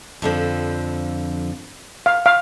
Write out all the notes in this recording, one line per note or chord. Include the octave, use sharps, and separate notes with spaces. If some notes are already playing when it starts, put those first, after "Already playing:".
F2 D3 F3
F5
F5